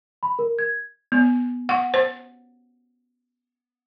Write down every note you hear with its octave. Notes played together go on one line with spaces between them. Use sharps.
B5
A#4
G#6
B3
F#5
C5